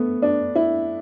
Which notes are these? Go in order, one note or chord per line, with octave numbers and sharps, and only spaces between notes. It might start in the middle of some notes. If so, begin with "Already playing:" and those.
Already playing: A3 B3
D4
E4